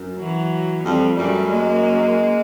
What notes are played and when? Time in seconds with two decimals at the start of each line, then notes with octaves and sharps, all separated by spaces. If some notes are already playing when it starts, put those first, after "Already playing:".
Already playing: F#2
0.17 E3 F#3
0.84 F2 F3 G3
1.17 F#2 G3 A3
1.51 G#3 A#3